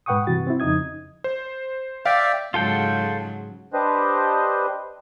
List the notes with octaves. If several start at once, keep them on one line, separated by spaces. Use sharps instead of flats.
G#2 B4 F#5 G5 C#6 D#6
G2 C3 E3 F#4 A6
C4 E4
F2 C#3 D#4 D#6 G#6
C5
D5 E5 F5 G5
G#2 C#3 F#3 F4 A4 G5
D4 G4 B4 C5 D#5